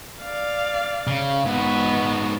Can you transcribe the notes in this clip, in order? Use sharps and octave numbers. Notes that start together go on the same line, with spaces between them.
D5 F5
C#3
G#2 B3 F#4